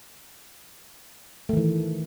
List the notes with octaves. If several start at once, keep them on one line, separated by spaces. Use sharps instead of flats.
D#3 E3 A3